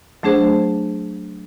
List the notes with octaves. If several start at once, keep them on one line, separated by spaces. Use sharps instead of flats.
F#3 A3 D4 G#4 C5